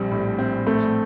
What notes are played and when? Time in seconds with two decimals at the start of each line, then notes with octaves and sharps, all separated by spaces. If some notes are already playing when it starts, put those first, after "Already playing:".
Already playing: A#1 G3 C4
0.11 A2
0.39 C4
0.67 A3 C4